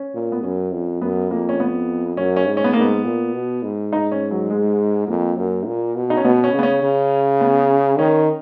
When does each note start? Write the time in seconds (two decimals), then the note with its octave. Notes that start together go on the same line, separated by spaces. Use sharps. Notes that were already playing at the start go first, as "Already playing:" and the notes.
Already playing: C#4
0.14 A#2
0.32 B3
0.43 F#2 C#4
0.72 F2
1.01 F#2 B3
1.30 F2 A#3
1.49 C#4
1.60 B3
2.17 F#2 C#4
2.36 C#4
2.47 G#2
2.57 C#4
2.64 B3
2.73 G#2 A#3
2.81 B3
3.05 A#2
3.34 B2
3.63 G#2
3.92 D#4
4.12 C#4
4.31 F#3
4.50 G#3
5.08 F2 A#3
5.37 F#2
5.66 A#2
5.96 B2
6.10 D#4
6.17 C#4
6.24 B2 B3
6.44 C#4
6.53 C#3
6.59 B3
6.63 C#4
6.82 C#3
7.41 B3
7.98 D#3 C#4